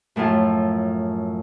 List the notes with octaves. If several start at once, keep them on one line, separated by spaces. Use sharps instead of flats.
F#2 A2 F3 F4